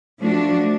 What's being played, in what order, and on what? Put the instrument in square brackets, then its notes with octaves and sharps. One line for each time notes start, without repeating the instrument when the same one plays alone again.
[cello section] F3 A3 D4 F#4